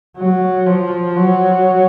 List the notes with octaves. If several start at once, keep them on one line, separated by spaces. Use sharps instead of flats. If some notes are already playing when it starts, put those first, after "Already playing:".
F#3
F3
F#3